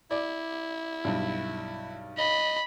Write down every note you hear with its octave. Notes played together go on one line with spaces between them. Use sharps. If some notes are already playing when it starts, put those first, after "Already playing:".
E4 D5 D6
B1 G2
D#5 B5